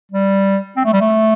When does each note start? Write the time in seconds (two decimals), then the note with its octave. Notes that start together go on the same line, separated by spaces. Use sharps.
0.12 G3
0.77 C4
0.85 A3
0.93 G3
1.01 A3